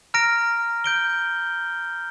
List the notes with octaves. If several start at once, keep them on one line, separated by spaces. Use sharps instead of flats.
A#5 F6 A#6 D7
G6 D7 G7